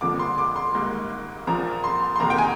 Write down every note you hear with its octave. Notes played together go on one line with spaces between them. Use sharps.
G1 F2 D3 F3 A#3 D6
C6
D6
C6
G#1 G#2 G3 A#3
A#1 A#2 F3 A#3 A#5
C6
C6
F2 C3 D#3 A#3 A#5
G5
G#5